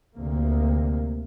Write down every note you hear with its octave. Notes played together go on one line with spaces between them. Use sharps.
D2 C3 A#3